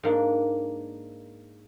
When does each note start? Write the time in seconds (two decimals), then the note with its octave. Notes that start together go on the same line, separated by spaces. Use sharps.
0.03 G#2 A#3 D4